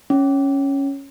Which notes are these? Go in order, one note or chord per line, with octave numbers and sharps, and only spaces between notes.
C#4